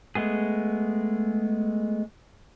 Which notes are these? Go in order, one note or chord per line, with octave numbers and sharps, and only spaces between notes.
G#3 A3 B3 G#4